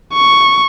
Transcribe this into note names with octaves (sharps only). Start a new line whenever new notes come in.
C#6